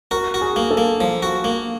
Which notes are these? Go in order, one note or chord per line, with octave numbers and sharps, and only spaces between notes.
F#4 A#4
F#4
G#4
A#3
A4
A#3
F3
F#4
A#3